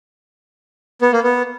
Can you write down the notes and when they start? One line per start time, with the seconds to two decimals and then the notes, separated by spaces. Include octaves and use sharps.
1.02 B3
1.13 A#3
1.23 B3